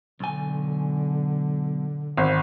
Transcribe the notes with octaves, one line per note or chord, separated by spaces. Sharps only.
B1 D3 G#5
G#1